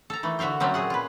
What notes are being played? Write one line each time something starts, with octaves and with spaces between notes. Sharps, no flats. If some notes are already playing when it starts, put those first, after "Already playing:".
A4 A#5
D#3 E3 A3
D3 F#4 E5 F5 G5
F#3 A3 A#3 C4 C#4
A#2 G#4 F#5
F4 B4